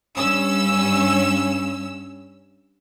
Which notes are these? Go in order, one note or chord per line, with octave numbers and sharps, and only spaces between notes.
G2 C#4 E6